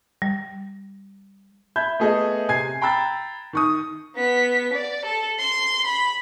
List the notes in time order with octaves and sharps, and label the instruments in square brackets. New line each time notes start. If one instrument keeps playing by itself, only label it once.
[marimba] G3
[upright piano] E5 B5 G6 G#6
A3 B3 G#4 A4 D#5
C3 G#5 G#6 C7
G5 A#5 B5 E6 A6
D#3 C#6 D#6
[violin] B3 B6
D5
A4
C6
B5